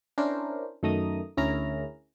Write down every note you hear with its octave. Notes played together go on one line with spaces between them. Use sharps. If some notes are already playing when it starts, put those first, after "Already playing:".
C#4 D4 E4 A#4 C5
F#2 D#3 A3 A#5 D#6
D2 C#4 E4 G#4 A#4 A#5